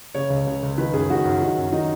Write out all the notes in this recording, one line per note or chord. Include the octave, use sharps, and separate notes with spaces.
C#3 C#5
C#2
C#3
C#2
D#3 B4
F#2 G#4
D#3 F#4
F#2
D#3
F#2
D#3 D#4